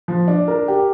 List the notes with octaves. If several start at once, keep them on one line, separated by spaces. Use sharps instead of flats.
F3
D4
A#4
G4